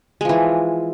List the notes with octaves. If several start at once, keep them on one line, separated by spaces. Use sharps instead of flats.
E3 F3 G#3